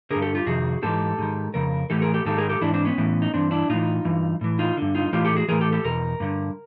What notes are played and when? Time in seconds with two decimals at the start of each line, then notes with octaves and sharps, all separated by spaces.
0.11 G2 D3 G#4 A#4
0.22 G4 A4
0.35 F4 G4
0.46 F2 C3 D#3 F#4 G#4
0.83 G#2 E3 G4 A4
1.18 G#2 D#3
1.54 F2 C#3 A#4
1.90 A2 E3 G4 A4
2.02 G#4 A#4
2.14 G4 A4
2.25 G#2 D#3 G4 A4
2.38 G#4 A#4
2.49 G4 A4
2.61 G#2 E3 D4 E4
2.74 C4 D4
2.85 B3 C#4
2.98 A2 E3
3.22 D#4
3.34 G2 E3 C4 D4
3.51 D4 E4
3.69 A2 E3 D#4 F4
4.05 G2 E3
4.41 A2 E3
4.59 D#4 F4
4.77 G2 D3
4.95 D#4 F4
5.13 A2 E3 F4 G4
5.25 G4 A4
5.36 F#4 G#4
5.48 A2 E3 G#4 A#4
5.61 G4 A4
5.72 G4 A4
5.84 E2 B2 A#4
6.20 G2 D3